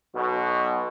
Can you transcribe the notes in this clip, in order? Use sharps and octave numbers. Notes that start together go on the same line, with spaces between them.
B1 B2